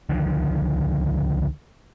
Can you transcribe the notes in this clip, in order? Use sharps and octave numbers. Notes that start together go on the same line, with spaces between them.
C#2 D3 D#3 F3